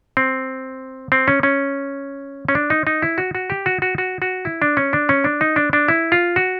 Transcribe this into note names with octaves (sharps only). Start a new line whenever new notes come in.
C4
C4
C#4
C#4
C#4
D4
D#4
D#4
E4
F#4
F#4
G4
F#4
F#4
F#4
F#4
E4
D4
C#4
D4
C#4
D4
D#4
D4
D4
E4
F4
F#4